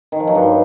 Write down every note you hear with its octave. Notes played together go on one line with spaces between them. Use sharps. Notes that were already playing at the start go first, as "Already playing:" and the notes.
D#3
F3
F#3
G2